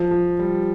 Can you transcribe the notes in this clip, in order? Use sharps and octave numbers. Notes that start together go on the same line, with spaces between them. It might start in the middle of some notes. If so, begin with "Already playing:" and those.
Already playing: F3
F3
G3